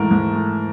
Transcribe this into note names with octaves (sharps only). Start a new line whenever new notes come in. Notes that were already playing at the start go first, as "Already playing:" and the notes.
Already playing: G#2 E3 A3 A#4
G#2
A3